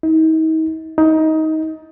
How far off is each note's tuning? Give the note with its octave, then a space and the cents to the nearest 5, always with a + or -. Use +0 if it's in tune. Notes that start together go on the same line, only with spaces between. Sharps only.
D#4 +40
D#4 +20